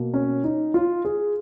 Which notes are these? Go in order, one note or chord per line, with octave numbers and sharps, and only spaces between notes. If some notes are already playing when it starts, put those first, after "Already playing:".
Already playing: B2 A#3
C#4
D#4
F4
G#4